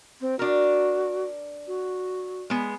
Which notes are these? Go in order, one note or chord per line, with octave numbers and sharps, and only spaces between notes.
C4
D4 F#4 A#4
F#4
G#3 B3